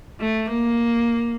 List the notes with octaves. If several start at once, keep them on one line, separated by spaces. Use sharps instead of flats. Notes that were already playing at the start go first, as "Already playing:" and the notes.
A3
A#3